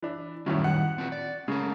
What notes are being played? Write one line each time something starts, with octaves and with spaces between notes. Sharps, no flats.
E3 D4
F#2 A2 D#3 G3
F#5
C4 F4 B4
D5
C#3 G#3 A3 A#4